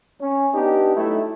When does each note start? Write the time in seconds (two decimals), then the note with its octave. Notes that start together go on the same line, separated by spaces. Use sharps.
0.21 C#4
0.54 B3 D4 D#4 G4
0.96 F#3 A3 D#4 E4